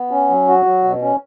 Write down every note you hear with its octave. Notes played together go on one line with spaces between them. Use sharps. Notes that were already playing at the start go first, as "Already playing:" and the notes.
Already playing: B3
C#4
F#3
F#4
F#3
B2
C#4